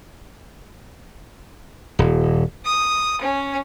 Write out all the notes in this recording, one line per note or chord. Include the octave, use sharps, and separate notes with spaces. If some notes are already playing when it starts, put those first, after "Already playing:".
D#1
D#6
C#4